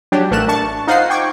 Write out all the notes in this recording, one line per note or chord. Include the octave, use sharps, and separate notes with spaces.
F#3 D4 G4
A1 A3 A#4 F#6 E7
D4 A5 C#6
D#4 F4 C5 F#5 C7
G5 C#6 D6 G#6